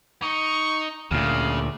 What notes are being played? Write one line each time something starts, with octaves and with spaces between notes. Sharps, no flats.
D#4 C#6
D2 A#2 C#3 F5